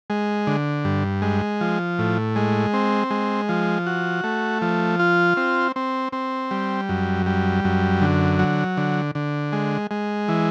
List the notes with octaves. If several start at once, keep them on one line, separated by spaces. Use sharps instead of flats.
G#3
D3
G2
G#3
F3
A2
G#3
C4
G#3
F3
F#4
A3
F3
F4
C4
C4
C4
G3
F#2
G3
F#2
D3
F#3
D3
D3
G#3
G#3
E3